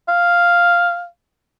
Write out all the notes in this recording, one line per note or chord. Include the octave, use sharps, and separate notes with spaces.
F5